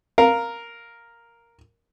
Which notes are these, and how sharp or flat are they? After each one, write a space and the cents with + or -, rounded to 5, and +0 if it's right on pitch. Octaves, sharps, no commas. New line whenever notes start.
A#4 +0 F5 +0